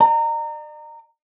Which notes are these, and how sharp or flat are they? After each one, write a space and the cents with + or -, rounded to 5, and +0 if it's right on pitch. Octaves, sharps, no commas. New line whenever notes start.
D5 +45 A#5 -20